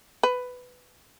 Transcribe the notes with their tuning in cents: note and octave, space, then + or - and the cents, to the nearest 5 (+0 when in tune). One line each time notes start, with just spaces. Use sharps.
B4 +10